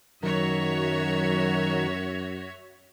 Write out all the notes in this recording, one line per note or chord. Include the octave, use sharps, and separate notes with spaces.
F#2 D#3 F#3 F#4 A#4 C#5 E5